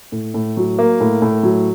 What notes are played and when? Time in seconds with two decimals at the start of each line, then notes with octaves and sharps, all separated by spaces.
0.12 A2
0.34 A2
0.57 F#3
0.79 A#3
1.00 A2
1.22 A2
1.43 F#3